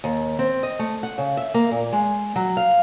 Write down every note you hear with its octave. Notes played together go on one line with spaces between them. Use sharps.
D#2
C4
D#5
A3
F#5
C#3
E5
A#3
A#2
G#3
F#3
F5